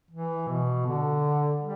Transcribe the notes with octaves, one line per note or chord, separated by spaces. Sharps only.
E3
B2
D3
G3